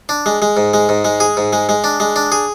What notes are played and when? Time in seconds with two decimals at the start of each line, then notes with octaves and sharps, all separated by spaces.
0.09 D4
0.26 G#3
0.42 G#3
0.57 G#2
0.74 G#3
0.89 G#2
1.05 G#3
1.20 G#4
1.37 G#2
1.53 G#3
1.69 G#3
1.84 D4
2.00 G#3
2.16 D4
2.32 G#4